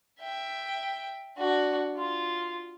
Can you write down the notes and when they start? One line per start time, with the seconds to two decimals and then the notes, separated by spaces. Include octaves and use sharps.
0.19 E5 G5
1.37 D4 F#4
1.97 F4